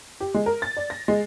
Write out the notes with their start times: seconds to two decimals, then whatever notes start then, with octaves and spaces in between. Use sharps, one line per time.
0.20 G4
0.34 G#3
0.46 A#4
0.62 A6
0.77 D5
0.90 A#6
1.08 G#3